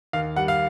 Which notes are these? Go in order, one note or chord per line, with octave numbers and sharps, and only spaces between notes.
D#2 F5
G3 F#5
F5